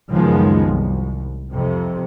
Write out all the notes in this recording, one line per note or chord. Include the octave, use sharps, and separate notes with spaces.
C#2 F#2 D#3 F3 G#3 B3
C2
F2 C3